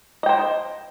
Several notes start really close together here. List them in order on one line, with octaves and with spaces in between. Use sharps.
D#5 G5 C5